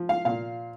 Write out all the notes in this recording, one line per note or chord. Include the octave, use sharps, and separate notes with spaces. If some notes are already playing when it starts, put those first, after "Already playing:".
Already playing: F3
F5
A#2 F5